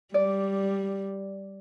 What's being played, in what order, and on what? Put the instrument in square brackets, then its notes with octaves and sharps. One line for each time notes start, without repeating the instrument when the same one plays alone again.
[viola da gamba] G3 [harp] D5